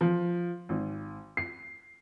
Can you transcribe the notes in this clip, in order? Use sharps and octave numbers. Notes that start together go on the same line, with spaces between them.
F3
G#1
C7